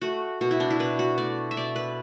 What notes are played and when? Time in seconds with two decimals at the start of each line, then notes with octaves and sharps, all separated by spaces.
0.02 A3 F#4
0.41 B2 F#4
0.51 E4
0.60 D4
0.70 E4
0.79 B2 B4
0.99 F#4
1.18 A3 D5
1.51 E5
1.57 B2 D5
1.76 B4